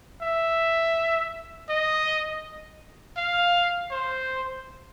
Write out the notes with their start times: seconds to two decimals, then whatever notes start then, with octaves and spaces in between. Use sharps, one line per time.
0.22 E5
1.69 D#5
3.17 F5
3.90 C5